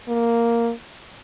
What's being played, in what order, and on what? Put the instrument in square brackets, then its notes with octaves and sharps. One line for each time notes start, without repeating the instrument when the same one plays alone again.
[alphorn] A#3